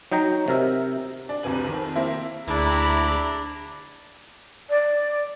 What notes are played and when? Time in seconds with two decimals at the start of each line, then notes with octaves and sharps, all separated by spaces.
0.12 F#3 D#4 G5 A#5
0.48 C3 A#4 E5
1.29 D4
1.43 F1 C2 C3 B4 G#5 F#7
1.64 F2 D#3
1.95 A#3 C4 E4 G4
2.47 D2 D4 E4 G#4 A#5 B5
4.69 D5